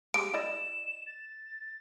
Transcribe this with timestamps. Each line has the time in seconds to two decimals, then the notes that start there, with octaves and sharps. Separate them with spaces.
0.14 G#3 G4 D7
0.34 E4 D5 D#5 E7
1.07 A6